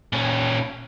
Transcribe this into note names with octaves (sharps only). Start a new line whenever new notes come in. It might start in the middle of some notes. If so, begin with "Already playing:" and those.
A#2 C#4